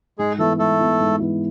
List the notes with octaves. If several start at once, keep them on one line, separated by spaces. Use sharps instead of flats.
G#2 G#3 G#4
E3 A3 B3 E4 A4
G#2 A3 A4
E3 B3 E4
G#2
E3 B3 E4